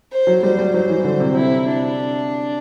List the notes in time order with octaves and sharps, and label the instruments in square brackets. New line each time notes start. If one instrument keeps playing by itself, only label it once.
[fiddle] C5
[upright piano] F#3
[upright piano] G3 [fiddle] C5
[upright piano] G3
[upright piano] F#3 [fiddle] C5
[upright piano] E3
D3
C3
[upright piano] C3 [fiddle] E4
[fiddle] D4